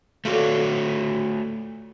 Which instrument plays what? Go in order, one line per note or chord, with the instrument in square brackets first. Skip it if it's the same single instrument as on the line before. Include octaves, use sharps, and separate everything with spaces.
[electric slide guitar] A3 F#4 C#5 [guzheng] F4 A4 D5